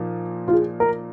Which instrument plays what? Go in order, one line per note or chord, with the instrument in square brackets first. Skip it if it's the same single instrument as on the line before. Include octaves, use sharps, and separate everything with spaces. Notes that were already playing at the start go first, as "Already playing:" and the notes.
Already playing: [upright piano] A#2 F3 A#3 D#4
[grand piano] F4
G#4
A#4